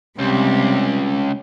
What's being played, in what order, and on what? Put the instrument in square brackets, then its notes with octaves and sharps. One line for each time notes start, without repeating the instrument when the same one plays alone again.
[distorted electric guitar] C#2 [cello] C3 G3